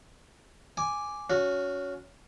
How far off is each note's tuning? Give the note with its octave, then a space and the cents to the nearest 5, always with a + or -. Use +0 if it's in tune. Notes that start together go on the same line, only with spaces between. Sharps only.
G#5 +0 D6 +0
C#4 +15 F#4 -15